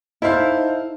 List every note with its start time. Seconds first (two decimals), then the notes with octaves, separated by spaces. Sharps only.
0.22 D#4 E4 A4 C5 F5